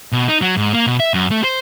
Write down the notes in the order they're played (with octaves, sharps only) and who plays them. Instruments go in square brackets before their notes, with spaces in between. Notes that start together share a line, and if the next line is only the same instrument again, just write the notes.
[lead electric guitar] B2
D#4
F#3
G#2
A#3
B2
E5
F#2
A3
C5